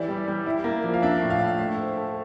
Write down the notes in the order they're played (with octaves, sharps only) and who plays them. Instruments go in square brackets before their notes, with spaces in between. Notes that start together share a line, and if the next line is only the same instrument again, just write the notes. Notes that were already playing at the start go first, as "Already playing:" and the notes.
Already playing: [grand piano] E3 [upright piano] G4 D5 E5
[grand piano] G3
G3
E4
A#3
F3
[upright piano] F5
[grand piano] D4 [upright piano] E5
[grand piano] A2
[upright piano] F5
[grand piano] A2
[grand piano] A3 [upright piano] E5
[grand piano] C5
A4